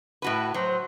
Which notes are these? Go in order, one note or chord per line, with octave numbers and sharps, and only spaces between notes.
A2 F#4 B4
F#3 C5